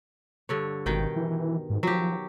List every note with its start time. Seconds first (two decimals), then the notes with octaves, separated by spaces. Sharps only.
0.49 G2 D3 C#5
0.86 G#1 B2 D#3 G5
1.16 E3
1.70 G#2
1.83 F3 F#3 G4